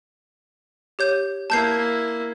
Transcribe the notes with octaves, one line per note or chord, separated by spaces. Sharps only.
G4 C#5 G6
A#3 E4 A5 G6 C7